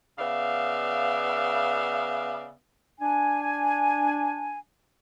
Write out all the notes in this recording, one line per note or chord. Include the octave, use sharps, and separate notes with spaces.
C#3 B3 D5 E5 F5
D4 G#5